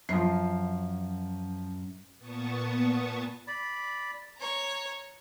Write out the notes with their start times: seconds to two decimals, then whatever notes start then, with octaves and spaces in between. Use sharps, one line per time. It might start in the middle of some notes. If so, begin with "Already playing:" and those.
0.09 F#2 F3 C7
2.18 A#2 B3 A5 C#6 D#6
3.47 D5 B5
4.38 C#5 A#5